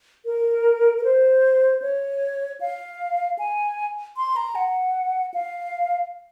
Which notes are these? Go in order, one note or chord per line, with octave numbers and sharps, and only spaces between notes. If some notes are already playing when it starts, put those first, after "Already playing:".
A#4
A#4
C5
C#5
F5
G#5
C6
A#5
F#5
F5